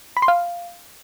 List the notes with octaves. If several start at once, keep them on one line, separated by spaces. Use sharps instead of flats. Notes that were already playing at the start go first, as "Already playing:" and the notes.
B5
C6
F5